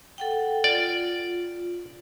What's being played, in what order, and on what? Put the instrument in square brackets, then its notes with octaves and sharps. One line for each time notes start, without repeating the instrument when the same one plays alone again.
[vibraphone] A4 F#5 G5
[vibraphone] F4 [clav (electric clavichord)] D5